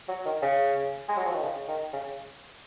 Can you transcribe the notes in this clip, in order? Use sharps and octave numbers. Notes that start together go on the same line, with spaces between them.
F#3
D#3
C#3
G#3
F#3
F3
D#3
C#3
D#3
C#3